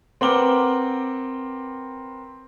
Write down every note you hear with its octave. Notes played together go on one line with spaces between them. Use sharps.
C4 A#4 B4 F#5 D6 G7